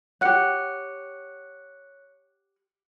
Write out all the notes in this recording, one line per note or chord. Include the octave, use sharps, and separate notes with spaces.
G4 C#5 F#5 F#6 C#7